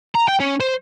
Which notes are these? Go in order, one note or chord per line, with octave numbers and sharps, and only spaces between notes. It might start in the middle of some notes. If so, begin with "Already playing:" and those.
A#5
G5
C#4
C5